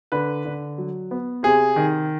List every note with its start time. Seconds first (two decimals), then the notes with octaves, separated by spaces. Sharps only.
0.12 D3 B4
0.45 D3
0.78 F#3
1.11 B3
1.43 C3 G#4
1.76 D#3